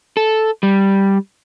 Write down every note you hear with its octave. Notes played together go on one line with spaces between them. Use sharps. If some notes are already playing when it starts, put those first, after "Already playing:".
A4
G3